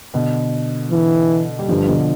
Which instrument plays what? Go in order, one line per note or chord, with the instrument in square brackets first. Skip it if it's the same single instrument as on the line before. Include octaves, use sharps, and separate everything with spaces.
[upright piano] B2 D3
[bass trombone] E3
[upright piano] G3
[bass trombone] G2 [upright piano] D3 F3
[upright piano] B2 D3